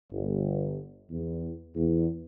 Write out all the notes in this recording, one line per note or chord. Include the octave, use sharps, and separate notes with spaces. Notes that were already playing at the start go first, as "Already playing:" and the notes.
G1
E2
E2